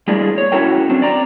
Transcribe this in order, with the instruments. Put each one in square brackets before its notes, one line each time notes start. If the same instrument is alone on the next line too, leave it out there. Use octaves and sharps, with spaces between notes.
[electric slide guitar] G3 G#3 A#3 D4 E4
C#5
C#4 E4 F#4 A4 A#4 G5
F#3 C4 D4
D5 G5 A#5